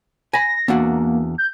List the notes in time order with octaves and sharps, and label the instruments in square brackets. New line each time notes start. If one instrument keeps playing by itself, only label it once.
[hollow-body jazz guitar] G#5 B5 [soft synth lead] A#6
[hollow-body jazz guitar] E2 D4 F#4 [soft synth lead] A#3
[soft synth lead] G6